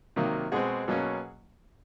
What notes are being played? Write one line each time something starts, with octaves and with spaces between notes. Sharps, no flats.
C3 D#3 F#3 A#3
B2 G#3 C4 F#4 G#4
B2 F#3 A#3 C#4